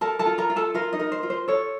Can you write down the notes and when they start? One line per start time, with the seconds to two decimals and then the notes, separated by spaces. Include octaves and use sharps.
0.01 A4 A#4 A5
0.19 A4 A5
0.26 F4
0.38 A#4 A#5
0.50 F4
0.56 A4 A5
0.74 F4 A#4 F5
0.92 D#4 D#5
1.00 A#4
1.12 C5
1.23 F4
1.30 C5
1.48 A4 C#5